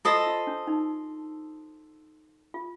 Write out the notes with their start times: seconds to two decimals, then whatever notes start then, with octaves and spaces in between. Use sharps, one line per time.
0.05 F4 A4 C5 D#5 A5
0.27 F4
0.47 D4
0.67 D#4
2.54 F4